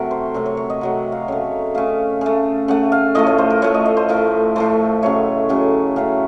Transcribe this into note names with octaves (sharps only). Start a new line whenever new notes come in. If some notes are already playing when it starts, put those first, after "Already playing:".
Already playing: C3 F#3 A3 F#4 A#4
C5
C3 F#3 A3 A#4
C#5
C#5
D#5
C3 F#3 A3 F#5
F5
C#3 A3 C#5
C#3 A3 F5
C#3 A3
C#3 A3 F#5
F5
A2 F3 A3 D#5
C#5
C5
A#4
A2 F3 A3 C#5
D#5
D#5
C5
A2 F3 A3 A#4
A2 F3 A3 C5
C#3 F#3 A3 C#5
C#3 F#3 A3
C#3 F#3 A3 F5